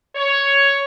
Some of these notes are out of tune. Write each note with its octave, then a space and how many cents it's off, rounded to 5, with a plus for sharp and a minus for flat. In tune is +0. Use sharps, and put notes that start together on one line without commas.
C#5 +5